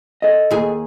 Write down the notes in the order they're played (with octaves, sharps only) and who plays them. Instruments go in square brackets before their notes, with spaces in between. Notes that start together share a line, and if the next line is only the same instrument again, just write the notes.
[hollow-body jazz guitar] A4 D#5
[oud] D#2 G#4